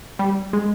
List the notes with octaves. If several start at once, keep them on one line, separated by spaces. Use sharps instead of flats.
G3
G#3